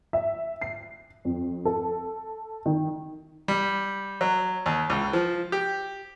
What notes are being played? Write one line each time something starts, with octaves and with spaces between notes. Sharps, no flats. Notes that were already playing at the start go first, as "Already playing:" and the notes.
E5
C7
F2
A4
D#3
G3
F#3
D#2
C#2
F3
G4